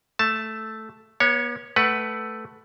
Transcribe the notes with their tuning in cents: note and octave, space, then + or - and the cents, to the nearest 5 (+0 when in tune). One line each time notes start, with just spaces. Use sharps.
A3 +0 A5 +0
B3 -40 C#5 +0
A3 +0 B4 +0 F#5 +20